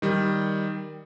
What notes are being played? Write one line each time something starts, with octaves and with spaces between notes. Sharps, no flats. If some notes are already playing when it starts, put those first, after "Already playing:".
D#3 G3